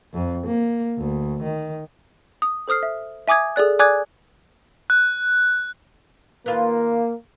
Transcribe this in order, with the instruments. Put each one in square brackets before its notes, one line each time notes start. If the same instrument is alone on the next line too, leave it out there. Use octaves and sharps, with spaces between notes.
[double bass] F2
A#3
D2
D#3
[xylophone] D#6
A4 C5 D#6 F6 C7
E5
E5 G#5 D6 D#6 G#6
G#4 A4 D5 F#6
D5 G#5 D6 D#6 F#6 G#6
[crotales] F#6
[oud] D#2 F4 B4 [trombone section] A#3